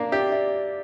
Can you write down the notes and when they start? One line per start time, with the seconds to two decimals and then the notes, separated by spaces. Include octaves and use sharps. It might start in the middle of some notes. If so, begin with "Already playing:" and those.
Already playing: A#3 D4
0.12 G4 D5 E5
0.32 D5 E5